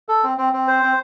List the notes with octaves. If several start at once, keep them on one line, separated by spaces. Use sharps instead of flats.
A4
C4
C4
C4
C5
C4